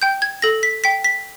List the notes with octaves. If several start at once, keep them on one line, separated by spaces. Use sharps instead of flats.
G5 G6
G#6
A4 A#6
B6
G5 B6
B6